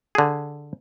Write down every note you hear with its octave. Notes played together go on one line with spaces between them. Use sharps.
D3 G#4